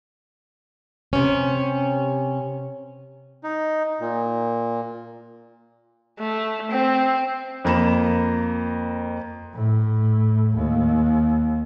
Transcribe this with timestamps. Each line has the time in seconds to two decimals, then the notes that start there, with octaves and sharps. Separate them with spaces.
1.13 C3 C#4
3.44 D#4
4.00 A#2
6.19 A3
6.71 C4
7.65 F2 A#3 A#5 B5 E7
9.55 A2
10.57 D#2